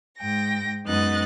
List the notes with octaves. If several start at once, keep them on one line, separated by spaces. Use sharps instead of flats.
G#2 G5 A#6
F#2 G#3 B3 D#4 F#6 A6